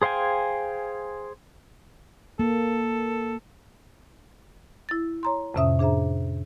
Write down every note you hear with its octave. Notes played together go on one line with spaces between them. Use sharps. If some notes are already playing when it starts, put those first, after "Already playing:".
G#4 C5 F5 G5 G#5
A#3 A4
E4 A6
C#5 A#5 C6
F2 A2 C3 C#4 E5 D#6
D4 G#4 C5 E5 A#5